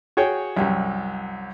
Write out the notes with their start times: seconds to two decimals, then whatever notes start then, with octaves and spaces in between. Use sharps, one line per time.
0.17 F#4 G#4 C#5 G5
0.57 C2 F#2